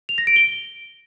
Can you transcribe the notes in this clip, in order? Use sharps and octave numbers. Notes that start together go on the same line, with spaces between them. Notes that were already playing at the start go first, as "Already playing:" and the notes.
F7
A#6
D7
G7